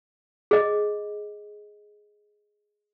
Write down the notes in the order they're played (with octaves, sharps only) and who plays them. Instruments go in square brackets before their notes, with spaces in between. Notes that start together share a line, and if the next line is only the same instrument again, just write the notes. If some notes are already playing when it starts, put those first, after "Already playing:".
[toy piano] G#4 D#5